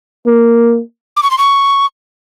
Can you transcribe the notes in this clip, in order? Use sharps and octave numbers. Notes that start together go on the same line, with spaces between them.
A#3
D6
C#6
C6
C#6